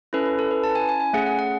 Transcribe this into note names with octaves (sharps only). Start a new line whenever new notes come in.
C#4 E4 A4 B4
B4
A4
B4
A5
G#5
G#5
G#5
A3 C#4 G#4 F#5
F#5
F#5